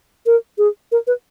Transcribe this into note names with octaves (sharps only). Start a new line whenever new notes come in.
A#4
G#4
A#4
B4